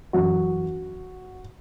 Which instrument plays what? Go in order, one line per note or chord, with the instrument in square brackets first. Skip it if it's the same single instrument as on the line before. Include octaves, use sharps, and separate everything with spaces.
[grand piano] F#2 E3 F#4